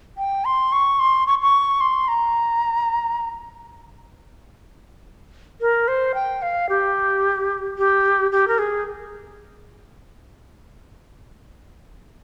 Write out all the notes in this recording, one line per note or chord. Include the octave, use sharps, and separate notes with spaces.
G5
C6
C#6
C6
C#6
C#6
C6
A#5
A#4
C5
G5
F5
G4
G4
G4
A#4
G#4